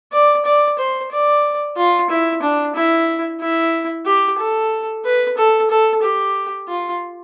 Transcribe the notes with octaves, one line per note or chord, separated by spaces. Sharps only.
D5
D5
C5
D5
F4
E4
D4
E4
E4
G4
A4
B4
A4
A4
G4
F4